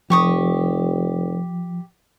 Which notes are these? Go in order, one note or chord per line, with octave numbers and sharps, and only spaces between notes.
F1 F3 G4 C#6 D#6